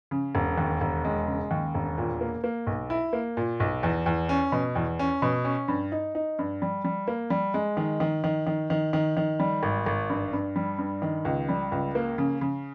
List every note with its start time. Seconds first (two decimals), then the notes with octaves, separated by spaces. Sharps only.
0.11 C#3
0.35 E1
0.58 D#2
0.81 E1
1.05 G#3
1.27 C#3
1.51 D#2
1.75 E1
1.98 A#2
2.21 A#3
2.44 A#3
2.67 B1
2.90 E4
3.13 A#3
3.37 A#2
3.60 B1
3.83 E2
4.06 E2
4.29 C#4
4.52 B2
4.75 E2
4.99 C#4
5.22 B2
5.45 C#4
5.68 G2
5.92 D#4
6.15 D#4
6.39 G2
6.62 G3
6.84 G3
7.08 A#3
7.30 G3
7.54 G#3
7.77 D#3
8.00 D#3
8.24 D#3
8.47 D#3
8.70 D#3
8.93 D#3
9.17 D#3
9.39 G3
9.63 G#1
9.86 G#1
10.10 G2
10.33 G2
10.56 G3
10.78 G2
11.02 D#3
11.25 C#2
11.49 G3
11.72 C#2
11.95 A#3
12.18 C#3
12.41 C#3